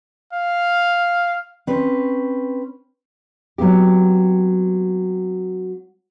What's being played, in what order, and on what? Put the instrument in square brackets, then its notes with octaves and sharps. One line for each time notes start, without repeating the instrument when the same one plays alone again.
[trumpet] F5
[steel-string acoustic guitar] C4 C#4 B4
[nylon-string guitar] F#3 B3 C4 G4